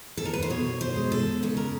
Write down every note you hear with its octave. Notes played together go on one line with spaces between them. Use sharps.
A4
A#4
B4
C5
B2 C#5
C5
G#3
A4
C#3 A4
A#4